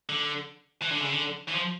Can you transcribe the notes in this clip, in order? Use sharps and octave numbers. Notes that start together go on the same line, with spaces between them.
D3
E3
D3
C#3
D3
E3
F3